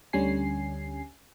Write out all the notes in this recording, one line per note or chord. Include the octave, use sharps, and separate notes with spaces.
D2 D3 G3 C#4 G#5 C7